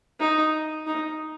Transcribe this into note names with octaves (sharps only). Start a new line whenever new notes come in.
D#4
D#4